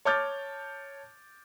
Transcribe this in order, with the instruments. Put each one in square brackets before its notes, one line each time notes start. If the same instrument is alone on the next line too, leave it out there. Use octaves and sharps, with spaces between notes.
[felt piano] C#5 A5 D6 F6 G6 A6